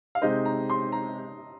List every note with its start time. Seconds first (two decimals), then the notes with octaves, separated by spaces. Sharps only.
0.15 F5
0.22 C3 G#3 D#4 C5 D#5
0.45 A#5
0.70 C6
0.92 A#5